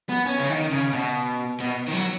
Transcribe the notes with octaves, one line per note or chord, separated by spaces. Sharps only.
B3
C#4
C#3
D#3
C#3
B2
B2
D#3
F#3